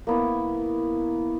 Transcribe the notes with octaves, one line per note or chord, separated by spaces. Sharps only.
A#3 B3 E4